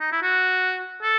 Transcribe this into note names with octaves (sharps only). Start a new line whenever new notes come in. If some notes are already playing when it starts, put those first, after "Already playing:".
D#4
E4
F#4
A4